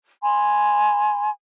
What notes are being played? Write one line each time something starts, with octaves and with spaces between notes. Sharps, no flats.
G#5 B5 C6